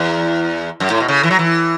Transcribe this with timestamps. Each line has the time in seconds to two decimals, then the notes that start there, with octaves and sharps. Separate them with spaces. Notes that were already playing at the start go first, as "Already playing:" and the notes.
Already playing: E2
0.80 F#2
0.90 A2
1.00 B2
1.08 C#3
1.23 E3
1.31 F#3
1.39 E3